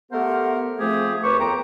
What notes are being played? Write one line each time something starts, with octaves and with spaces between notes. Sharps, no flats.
A3 B3 G4 A#4 C5 F#5
F3 A3 C4 G4 G#4
D#2 G#4 B4 C5 C#6 D6
F2 B3 G5 A#5